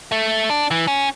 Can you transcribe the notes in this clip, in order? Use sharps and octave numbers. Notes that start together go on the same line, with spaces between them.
A3
D4
E3
C#4